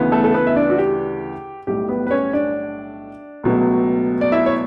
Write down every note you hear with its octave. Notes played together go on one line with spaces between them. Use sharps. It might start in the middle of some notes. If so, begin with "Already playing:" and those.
Already playing: D2 C#3 E3 B3
A3 A4
A4
B3 B4
E5
D4 D5
F#4
G4
B1 A2 G3 G4
B3 B4
B4
C#4 C#5
D4 D5
C#2 B2 F#3 A3
D5
E4 E5
C#5